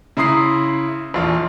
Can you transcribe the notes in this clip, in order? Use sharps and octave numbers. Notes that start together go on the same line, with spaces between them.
C#3 E4 A#5 C6 D#6 C7
A#1 E2 F4